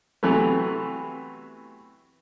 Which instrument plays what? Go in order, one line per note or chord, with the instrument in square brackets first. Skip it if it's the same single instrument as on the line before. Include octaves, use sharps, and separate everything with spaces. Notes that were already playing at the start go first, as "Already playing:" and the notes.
[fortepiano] C3 E3 F#3 A3 B3